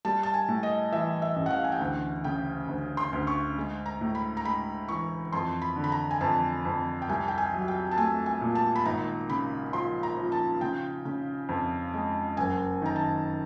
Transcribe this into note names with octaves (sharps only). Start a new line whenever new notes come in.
G3 A5
A5
G#5
A2
D#5
E3 E5
E5
A1
F#5
F5
G#5
G5
D2 F#5
C#3 G5
D2
C6
D2
C#6
G#3
A#5
A2
B5
A#5
G#3 B5
E3 C#6
F2 C6
B5
D3
B5
A#5
G#5
F2 A5
F2
G5
C2 G#5
G5
G#5
F#3
G5
A5
A3 G#5
G#5
A#2
A5
B5
G#1 A#5
C#3 B5
F3 C6
A#5
F3
A5
C#3 G5
C#3
F2
G#3
F#1 G#5
D#3 A#5
A5